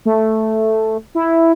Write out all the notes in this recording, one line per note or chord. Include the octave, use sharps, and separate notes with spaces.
A3
E4